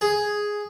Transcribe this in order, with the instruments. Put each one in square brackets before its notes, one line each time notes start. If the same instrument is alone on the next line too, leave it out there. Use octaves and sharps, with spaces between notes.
[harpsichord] G#4